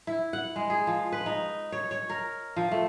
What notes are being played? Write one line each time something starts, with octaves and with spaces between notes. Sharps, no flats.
E4
F#5
G#3
G#4
F3
B4
D#4
C#5
C#5
A#4
F3
A3